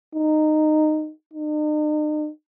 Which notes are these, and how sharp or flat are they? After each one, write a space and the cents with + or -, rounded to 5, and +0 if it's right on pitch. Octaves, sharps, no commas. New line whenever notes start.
D#4 -15
D#4 -45